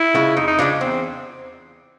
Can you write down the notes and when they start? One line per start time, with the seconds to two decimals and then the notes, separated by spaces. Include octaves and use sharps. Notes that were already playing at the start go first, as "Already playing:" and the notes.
Already playing: E4
0.15 C#3 F3 G#3
0.37 F2 D#4
0.47 D#4
0.59 C#3 F3 G#3 D4
0.81 E2 C4